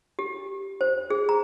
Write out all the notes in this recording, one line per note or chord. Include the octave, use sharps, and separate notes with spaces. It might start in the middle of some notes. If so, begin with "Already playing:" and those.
G4
C5
G#4
A#5